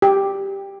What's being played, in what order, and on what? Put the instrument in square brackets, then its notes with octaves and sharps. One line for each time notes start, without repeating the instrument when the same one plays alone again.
[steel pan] G4